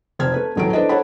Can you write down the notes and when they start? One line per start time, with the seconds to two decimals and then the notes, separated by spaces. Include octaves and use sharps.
0.19 F1 C5 F6 G#6
0.34 A3 B4
0.56 D#1 A1 F#3 A3 B3 D7
0.73 D4 E4 A4 B4 C5 D#5
0.89 A4 C5 C#5 F#5 A5 B5